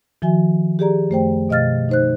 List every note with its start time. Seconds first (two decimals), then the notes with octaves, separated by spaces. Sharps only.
0.22 D#3 F3 F#4 E5 G#5
0.79 G4 G#4 D5 A#5
1.10 F#2 A3 C5 G5
1.49 B2 D#5 F5 F6 A6
1.89 D#4 C5 F#6